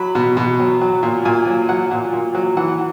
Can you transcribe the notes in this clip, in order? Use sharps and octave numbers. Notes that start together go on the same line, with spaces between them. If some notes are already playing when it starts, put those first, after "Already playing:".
Already playing: F#3 B5
B2
B2
F#3
F#3
A#2
A#2 G#5
F#3
F#3 F#5
A#2
A#2
F#3
E3 F#5